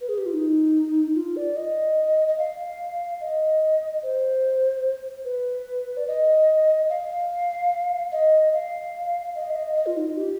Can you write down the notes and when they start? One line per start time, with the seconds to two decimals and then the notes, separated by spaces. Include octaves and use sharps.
0.01 B4
0.09 G#4
0.18 G4
0.26 F4
0.33 D#4
1.15 F4
1.36 D5
1.56 D#5
2.28 D#5
2.38 F5
3.21 D#5
4.03 C5
5.25 B4
5.97 D5
6.07 D#5
6.89 F5
8.12 D#5
8.53 F5
9.35 D#5
9.51 F5
9.56 D#5
9.76 D#5
9.86 F4
9.97 D#4
10.07 F4
10.17 G4